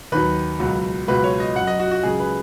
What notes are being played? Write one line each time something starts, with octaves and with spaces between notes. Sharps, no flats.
D#2 D#3 F#3 B4
C#2 B2 F#3
C#2 B2 F#3 B4
C#5
D#5
F#2 F#3 F#5
D#5
F#4
F#4
C#2 C#3 F#3 G#4
B4